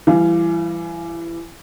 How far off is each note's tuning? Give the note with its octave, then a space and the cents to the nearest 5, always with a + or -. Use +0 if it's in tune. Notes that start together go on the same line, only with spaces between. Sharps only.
E3 +25 G3 +0 F5 -15